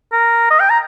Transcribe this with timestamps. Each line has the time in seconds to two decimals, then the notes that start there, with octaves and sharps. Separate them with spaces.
0.13 A#4
0.51 D#5
0.60 G5
0.70 A#5